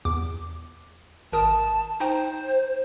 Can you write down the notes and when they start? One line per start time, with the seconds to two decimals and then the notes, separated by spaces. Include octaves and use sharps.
0.05 E2 D6
1.33 G#1 A#4 A5 D#6
2.00 D#4 C5 G5 A#5